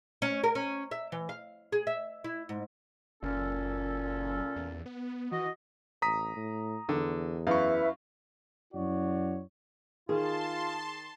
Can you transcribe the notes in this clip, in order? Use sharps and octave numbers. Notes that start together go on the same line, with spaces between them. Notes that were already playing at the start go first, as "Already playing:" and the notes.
C#4
A#4
C#4
E5
E3
F5
G#4
E5
E4
G#2
F#1 A#2 C#4 A4
E2
B3
E3 F#4 D#5
A1 A#5 D#6 B6
A2
E2 D3
F#2 E4 B4 E5 F5 C#6
F#2 E4 F#4 C#5 D5
D#3 F4 G#4 A5 C6